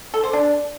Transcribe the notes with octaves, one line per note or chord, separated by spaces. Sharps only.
A4
C5
D4